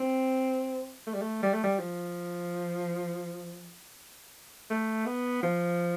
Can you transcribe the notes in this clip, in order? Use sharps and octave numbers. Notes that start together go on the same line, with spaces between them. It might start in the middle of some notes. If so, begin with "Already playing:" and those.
Already playing: C4
A3
G3
A3
G3
A3
G3
F3
A3
B3
F3